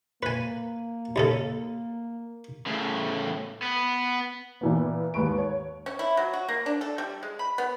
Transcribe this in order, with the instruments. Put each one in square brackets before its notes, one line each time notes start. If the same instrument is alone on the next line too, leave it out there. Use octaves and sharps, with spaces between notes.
[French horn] A#3 [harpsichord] B4 G#5
[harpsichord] D#2 C#3 A4
[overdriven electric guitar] A2 C#3
B3
[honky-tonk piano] A#2 E3 B3
D#2 G#2 B4 C#6 D7
C#5
[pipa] C#4
E4
F#3
F#4
A#3
D4
A4
G3
G#3
B5
B3